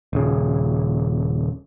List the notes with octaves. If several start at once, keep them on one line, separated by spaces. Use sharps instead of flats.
D#1 C#3